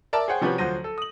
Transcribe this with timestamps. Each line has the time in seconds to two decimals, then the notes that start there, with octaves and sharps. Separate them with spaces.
0.13 A#4 D5 E5 A5
0.28 G#4 C5 C#5 F#5 G5
0.41 C3 F3 C#4 F#4 G4 B4
0.58 D2 F3 F#3 C5 A#6 D#7
0.84 A4
0.98 D#6 F#7